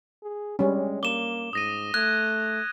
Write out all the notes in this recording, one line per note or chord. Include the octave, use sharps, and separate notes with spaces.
G#4
G3 G#3 C#4
A#3 D6 E7 G7
G#2 D#6 A#6 D#7
A3 F#6 G#6